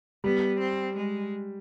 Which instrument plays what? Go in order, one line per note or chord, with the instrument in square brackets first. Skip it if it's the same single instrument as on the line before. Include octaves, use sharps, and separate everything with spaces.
[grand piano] G3 [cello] B3
[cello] C4
G#3